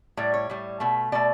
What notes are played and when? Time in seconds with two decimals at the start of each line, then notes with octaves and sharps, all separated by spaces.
0.17 A2 G3 D5
0.34 C#5
0.50 A2 G3
0.80 B2 A3
1.12 B2 A3 D5